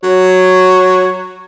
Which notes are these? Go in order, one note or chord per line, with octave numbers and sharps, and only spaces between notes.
F#3 C#5